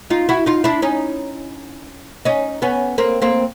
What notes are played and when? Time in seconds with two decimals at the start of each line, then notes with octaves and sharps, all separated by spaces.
0.10 D#4 F4
0.29 E4 F#4
0.46 D#4 F4
0.64 D4 E4
0.82 C#4 D#4
2.25 C#4 D#4
2.62 B3 C#4
2.98 A#3 C4
3.22 A#3 C4